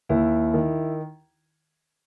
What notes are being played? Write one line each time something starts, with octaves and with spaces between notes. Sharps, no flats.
D#2 E4
D#3